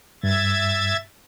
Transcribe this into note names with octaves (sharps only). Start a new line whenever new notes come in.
G2 E5 G#6 A6